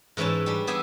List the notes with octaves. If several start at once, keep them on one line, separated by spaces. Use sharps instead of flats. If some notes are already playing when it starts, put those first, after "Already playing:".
G#2 E3 C#4 B4 C#5 A5
G3 D4
B3 G4 G#4 E5 G#5